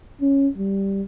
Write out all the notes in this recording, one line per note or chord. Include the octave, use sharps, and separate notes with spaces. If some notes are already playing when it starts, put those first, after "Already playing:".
C#4
G3